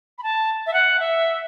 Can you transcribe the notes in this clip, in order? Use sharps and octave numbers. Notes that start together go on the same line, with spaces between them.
B5
A5
E5
F#5
E5